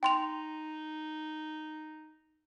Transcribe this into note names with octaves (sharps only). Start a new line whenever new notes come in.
D#4 G5 C6 F7